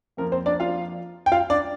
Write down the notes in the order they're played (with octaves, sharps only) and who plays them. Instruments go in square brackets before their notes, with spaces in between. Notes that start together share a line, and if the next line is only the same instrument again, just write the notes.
[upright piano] F2 F3 A#3 A#4
C4 C5
D4 D5
F4 F5
G5
F4 F5
D4 D5